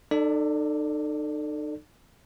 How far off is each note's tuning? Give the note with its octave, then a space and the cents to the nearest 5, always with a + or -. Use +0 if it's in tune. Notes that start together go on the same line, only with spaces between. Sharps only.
D#4 -40 A4 +15 D5 +0